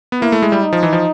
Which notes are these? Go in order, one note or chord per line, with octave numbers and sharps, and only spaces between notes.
B3
A#3 E4
A3
G#3
G3
D#4
F3
E3
F3